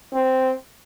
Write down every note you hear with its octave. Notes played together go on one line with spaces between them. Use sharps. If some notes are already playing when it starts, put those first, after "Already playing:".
C4